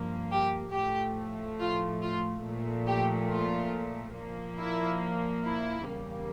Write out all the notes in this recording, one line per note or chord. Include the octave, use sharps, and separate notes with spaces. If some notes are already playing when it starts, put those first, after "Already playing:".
Already playing: G2 F3 A#3
G4
A2 F3 A3 G4
F4
F4
A#2 F3 A3
G4
F4
A#2 F3 A#3
E4
E4
E2 C#3 G3 A#3